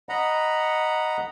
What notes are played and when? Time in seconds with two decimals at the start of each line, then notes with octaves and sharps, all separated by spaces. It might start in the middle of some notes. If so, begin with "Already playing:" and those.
0.09 D#5 F#5 A#5 B5